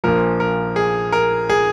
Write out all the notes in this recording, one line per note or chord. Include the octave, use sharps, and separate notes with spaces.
A#1 A#2 F3 A#4
A#4
G#4
A#4
G#4